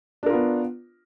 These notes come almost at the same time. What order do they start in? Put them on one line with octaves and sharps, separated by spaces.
D4 A#4 F4 B3